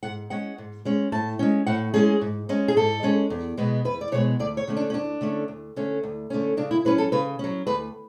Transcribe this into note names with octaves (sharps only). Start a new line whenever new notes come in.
G#2 F#5
G#3 C#4 F#5
G#2
G#3 C#4
A2 A5
G#3 C#4
A2 F#5
G#3 C#4 G#4
G#2
G#3 C#4
G#4
G#2 A4
G#3 C#4
E2
B2 G#3 B3
E2 B4
D5
B2 G#3 B3 C#5
D2 D5
C#5
D3 A3 C#4
D4
C#4
D2 D4
D3 A3 C#4
D2
D3 A3 C#4
D2
D3 A3 C#4
C#3 D4
E4
F#3 C#4 B4
A4
C#3 B4
F#3 C#4
D2 B4